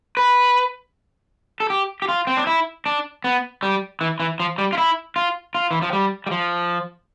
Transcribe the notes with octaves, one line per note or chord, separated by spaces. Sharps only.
B4
A4
G4
G4
F4
C4
D4
E4
D4
B3
G3
E3
E3
F3
G3
F4
E4
F4
F4
E3
F3
G3
G3
F3